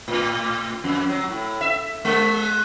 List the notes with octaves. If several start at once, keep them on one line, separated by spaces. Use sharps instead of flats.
A2
F2
F#3
A2
E5
G#3